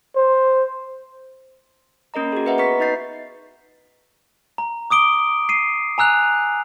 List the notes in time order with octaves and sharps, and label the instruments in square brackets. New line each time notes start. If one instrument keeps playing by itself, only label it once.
[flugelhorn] C5
[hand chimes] A#3 C#4 A#4 D#5 A#5
F#4 G#4
B4 D#5 E5 F#5 A#5
B3 B4 A#5 C#6 B6
D#4 F#4 D#5 G6 A6 C7
[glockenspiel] A#5
D6 D#6 D7 G7
C7 D#7
G#5 A#5 E6 F#6 F7